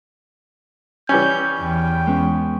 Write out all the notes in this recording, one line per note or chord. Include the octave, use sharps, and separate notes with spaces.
E3 G3 C#4 G6
E2 G5
G#3 B3 C#4